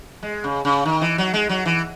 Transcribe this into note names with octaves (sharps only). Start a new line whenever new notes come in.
G#3
C#3
C#3
D#3
E3
F#3
G#3
F#3
E3